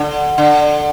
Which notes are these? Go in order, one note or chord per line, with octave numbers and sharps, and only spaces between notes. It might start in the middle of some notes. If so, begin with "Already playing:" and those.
Already playing: D3
D3